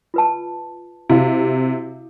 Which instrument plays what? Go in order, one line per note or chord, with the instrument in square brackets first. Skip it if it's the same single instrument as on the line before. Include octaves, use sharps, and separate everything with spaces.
[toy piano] F4 B4 A5
[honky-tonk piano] C3 [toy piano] E4 F#4 F5